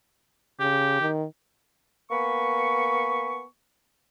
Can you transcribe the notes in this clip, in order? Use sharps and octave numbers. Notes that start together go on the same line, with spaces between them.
C#3 G4
D#3
A#3 B3 G#5 B5 C#6